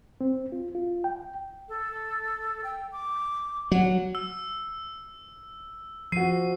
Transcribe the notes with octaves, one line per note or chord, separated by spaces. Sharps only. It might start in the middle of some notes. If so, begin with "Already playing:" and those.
C4
F4
F4
G5
A4
G5
D6
F#3 F#5
E6
F3 F#4 C7 D#7